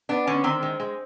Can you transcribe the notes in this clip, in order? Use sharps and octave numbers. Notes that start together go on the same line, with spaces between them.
B3 D4
D3 C#4
D#3 C4
G#3
G#3